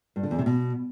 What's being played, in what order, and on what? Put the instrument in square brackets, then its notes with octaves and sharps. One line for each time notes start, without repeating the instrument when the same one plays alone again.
[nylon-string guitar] G2
D3
E2
C3
B2